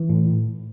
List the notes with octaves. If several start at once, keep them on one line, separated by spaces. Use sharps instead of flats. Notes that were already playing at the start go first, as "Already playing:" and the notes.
Already playing: E3
A2